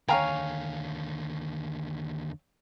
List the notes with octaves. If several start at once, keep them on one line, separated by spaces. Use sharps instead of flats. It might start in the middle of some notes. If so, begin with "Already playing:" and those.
D#2 D3 C#5 F5 G5 G#5 A#5